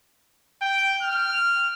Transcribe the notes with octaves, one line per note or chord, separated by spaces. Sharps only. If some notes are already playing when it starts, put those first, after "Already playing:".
G5
F6